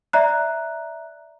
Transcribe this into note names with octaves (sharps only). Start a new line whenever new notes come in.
D5 E5 A#5 F#6